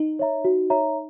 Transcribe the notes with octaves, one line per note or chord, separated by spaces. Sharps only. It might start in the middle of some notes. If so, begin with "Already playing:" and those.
Already playing: D#4
C#5 E5 A#5
F#4
C#5 E5 A#5